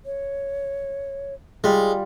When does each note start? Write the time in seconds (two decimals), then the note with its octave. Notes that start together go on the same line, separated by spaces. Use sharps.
0.06 C#5
1.64 G3 G#3 F4